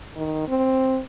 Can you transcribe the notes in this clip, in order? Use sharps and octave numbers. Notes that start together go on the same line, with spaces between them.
D#3
C4